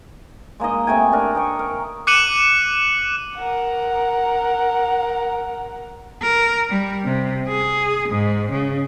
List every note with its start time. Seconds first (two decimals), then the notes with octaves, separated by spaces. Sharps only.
0.60 G#3 A#3 D#4 D#5
0.87 C3 A3 G5 G#5
1.12 D4 A#4
1.35 D#5 G5 C#6
1.59 A#4
2.07 D6 F#6 C#7 D#7 E7 F#7
3.36 A#4 F#5
6.22 A#4
6.70 G3
7.05 C3
7.48 G#4
8.09 G#2
8.52 C#3